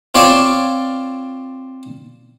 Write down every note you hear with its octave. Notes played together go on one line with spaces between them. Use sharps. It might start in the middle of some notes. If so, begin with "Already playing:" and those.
C4 F4 C#5 D5 F5 A5